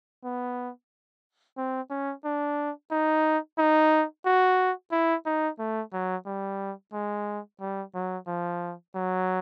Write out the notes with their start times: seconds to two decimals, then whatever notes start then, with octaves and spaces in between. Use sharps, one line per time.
0.24 B3
1.58 C4
1.91 C#4
2.25 D4
2.91 D#4
3.58 D#4
4.26 F#4
4.92 E4
5.26 D#4
5.59 A3
5.93 F#3
6.26 G3
6.93 G#3
7.60 G3
7.94 F#3
8.28 F3
8.95 F#3